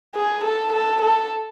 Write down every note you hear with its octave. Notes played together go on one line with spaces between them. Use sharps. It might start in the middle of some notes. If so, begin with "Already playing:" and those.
G#4
A4
A4
A4